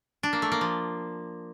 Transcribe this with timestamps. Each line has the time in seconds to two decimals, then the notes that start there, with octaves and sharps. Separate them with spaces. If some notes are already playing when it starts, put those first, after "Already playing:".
0.23 D4
0.33 A#3
0.42 A3
0.52 A#3
0.61 F3